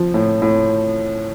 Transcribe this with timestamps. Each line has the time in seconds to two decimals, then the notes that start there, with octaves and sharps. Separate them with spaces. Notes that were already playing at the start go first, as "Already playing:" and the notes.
Already playing: F3
0.14 A2
0.42 A2